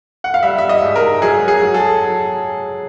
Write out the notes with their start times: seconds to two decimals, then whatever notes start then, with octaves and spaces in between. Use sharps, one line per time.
0.24 F#5
0.34 F5
0.43 G3 E5
0.58 E5
0.69 D#5
0.82 G#2
0.96 A#4
1.22 F#3 G#4
1.48 G#4
1.62 F#3
1.74 A4